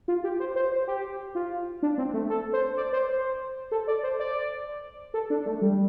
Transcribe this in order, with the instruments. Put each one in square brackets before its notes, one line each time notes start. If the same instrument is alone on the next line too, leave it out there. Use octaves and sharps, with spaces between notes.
[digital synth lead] F4
G4
C5
C5
C5
G4
F4
D4
C4
A3
A4
C5
D5
C5
C5
A4
D5
C5
D5
A4
D4
A3
G3